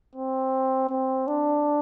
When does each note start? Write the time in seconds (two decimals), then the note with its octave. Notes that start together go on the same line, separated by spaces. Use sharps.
0.15 C4
0.90 C4
1.27 D4